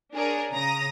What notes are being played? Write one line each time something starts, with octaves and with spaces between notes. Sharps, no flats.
D4 G#4 A#4 C#5
C#3 A#5 D#6 A#6